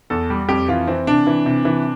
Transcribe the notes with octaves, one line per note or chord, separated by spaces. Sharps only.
E2 A4
G3
F2 G4
E3 F4
E3 C4
C3 D4
E3
C3
E3